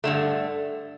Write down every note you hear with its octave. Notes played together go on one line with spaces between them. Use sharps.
G2 D3 A3